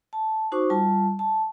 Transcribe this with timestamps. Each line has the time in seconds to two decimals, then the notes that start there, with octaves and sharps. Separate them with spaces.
0.13 A5
0.52 D#4 F#4 C5 C#6 D6
0.70 G3 F4 A5
1.19 A5